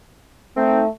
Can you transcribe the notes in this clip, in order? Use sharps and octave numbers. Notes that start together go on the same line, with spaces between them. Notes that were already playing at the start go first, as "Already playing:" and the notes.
A3 C4 D#4